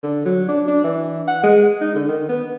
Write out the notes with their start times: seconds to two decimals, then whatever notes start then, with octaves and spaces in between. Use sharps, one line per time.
0.03 D3
0.25 F#3
0.48 D4
0.67 D4
0.84 E3
1.27 F#5
1.43 G#3
1.81 D#4
1.95 D3
2.08 D#3
2.29 B3